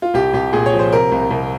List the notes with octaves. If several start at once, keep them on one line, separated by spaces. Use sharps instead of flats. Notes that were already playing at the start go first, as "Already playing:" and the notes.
F4
C2 G4
C2 G4
A#2 G#4
C#5
F3
C5
C3 A#4
C2
C2